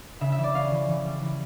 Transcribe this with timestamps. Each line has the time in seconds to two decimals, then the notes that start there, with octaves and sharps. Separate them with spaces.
0.21 C#3 E5
0.32 E5
0.38 E3
0.43 D5
0.54 C#4 F5
0.72 E3
0.88 E3
1.06 G3
1.22 E3